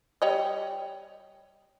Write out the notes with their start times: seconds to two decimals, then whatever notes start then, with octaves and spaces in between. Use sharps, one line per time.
0.22 G3 C#5 D#5